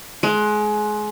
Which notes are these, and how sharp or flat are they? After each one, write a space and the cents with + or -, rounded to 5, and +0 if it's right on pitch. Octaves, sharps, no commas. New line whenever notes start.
G#3 +25